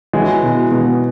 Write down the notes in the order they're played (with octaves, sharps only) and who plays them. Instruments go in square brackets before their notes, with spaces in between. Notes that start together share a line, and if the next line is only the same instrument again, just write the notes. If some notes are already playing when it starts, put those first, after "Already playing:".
[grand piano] E3 G#3 [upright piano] F#3
[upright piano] B2
B2